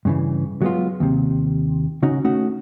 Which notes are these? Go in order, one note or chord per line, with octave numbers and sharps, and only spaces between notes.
G2 C#3 E3
F#3 G#3 B3 F4
D#2 C3
C#3 C#4 D#4 F#4
A3 C#4 D#4 F#4